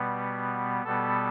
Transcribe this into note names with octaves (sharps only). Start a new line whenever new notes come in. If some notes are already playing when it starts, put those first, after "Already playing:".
Already playing: B2 G3 B3
B2 G3 B3 A4